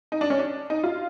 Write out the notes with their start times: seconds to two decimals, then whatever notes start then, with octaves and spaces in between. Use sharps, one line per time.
0.12 D#4
0.21 D4
0.30 C#4
0.39 D4
0.70 D#4
0.84 F4